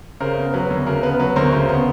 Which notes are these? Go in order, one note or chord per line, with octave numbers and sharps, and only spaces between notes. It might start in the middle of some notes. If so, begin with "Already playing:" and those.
C#3 A#4 C5
B3
F#3 B4
D2
C#3 A#4
B3 B4
F#3 B4
D2 A#4 C5
C#3
B3